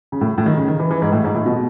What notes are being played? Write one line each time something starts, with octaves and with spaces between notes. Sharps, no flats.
C#3
A2
A2
D#3
C#3
D#3
E3
E3
G#2
A2
G#2
A2
B2